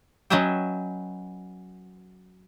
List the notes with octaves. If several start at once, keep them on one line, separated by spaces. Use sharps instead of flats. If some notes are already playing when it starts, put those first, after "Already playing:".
F#3 C#4 B4 D#5 E5 G5